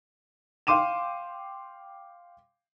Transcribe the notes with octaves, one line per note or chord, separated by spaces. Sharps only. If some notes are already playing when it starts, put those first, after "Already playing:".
F5 G5 C6 D6 D#7 E7